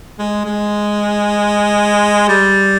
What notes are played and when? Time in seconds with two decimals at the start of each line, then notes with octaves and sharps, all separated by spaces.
0.19 G#3
0.44 G#3
2.28 G3